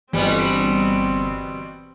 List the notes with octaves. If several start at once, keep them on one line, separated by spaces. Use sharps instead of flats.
G1 B2 E3 G3 B3 C4